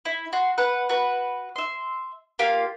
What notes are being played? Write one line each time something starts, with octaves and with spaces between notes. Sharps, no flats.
E4
F#4 C6
B4 F#5
F#4 B4
E5 C6
A#3 F4 G4 F5